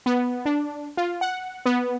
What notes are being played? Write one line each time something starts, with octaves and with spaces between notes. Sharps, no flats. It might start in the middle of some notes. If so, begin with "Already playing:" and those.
B3
D4
F4
F#5
B3